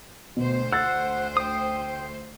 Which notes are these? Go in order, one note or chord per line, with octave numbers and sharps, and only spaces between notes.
D2 B2 C5
F#5 E6 A6
G5 D#6